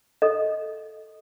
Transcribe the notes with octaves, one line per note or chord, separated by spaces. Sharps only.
A4 D#5